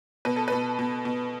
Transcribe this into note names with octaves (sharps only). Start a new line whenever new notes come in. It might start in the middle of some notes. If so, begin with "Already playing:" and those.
B2 B4
A4
B2 B4
B2
B2